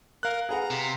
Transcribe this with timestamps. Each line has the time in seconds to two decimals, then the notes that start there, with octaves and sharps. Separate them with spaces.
0.23 A#4 F5 F#6
0.49 G#4 B4 F#5 A#5
0.70 C3